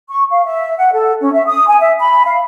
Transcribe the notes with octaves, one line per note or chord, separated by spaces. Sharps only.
C#6
F5
E5
F#5
A4
C#4
E5
D#6
G#5
E5
B5
F5